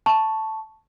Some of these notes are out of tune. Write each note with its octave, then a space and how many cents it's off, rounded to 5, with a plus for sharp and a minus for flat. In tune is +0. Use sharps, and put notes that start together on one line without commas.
A5 +0 C#6 +0